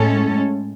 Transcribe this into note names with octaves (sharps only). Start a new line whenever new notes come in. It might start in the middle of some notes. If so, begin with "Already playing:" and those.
Already playing: A2 G#3 C#4 A4